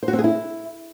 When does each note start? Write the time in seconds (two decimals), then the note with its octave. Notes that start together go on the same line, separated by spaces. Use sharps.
0.03 C5
0.08 F#4
0.13 C4
0.19 G#4
0.24 E4